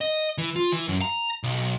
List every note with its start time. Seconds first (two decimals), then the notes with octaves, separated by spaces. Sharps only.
0.01 D#5
0.38 E3
0.56 F4
0.72 E3
0.88 F#2
1.01 A#5
1.43 B1